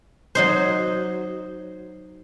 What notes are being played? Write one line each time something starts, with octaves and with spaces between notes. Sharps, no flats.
F#3 D#4 C5